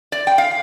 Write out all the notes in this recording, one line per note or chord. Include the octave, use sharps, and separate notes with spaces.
D5
G5
F5